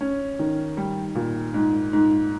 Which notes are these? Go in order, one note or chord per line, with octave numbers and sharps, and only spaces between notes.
C#4
D#3
G3
A#2
G#2
G#2